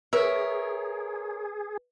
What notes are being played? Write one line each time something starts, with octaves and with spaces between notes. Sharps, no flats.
G#4 A#4 B4 C#5 E5